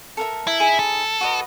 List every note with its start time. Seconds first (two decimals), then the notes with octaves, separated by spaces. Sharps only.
0.17 A4 A#4 E5
0.47 E4
0.60 D#4 G#4 B5
0.79 A4
1.21 F#4 B4 D#5